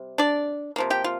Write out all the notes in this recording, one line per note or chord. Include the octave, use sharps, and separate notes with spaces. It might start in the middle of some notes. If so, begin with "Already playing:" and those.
Already playing: C3 G3
D4 D5
C3 F3 A#3
G4 G5
F4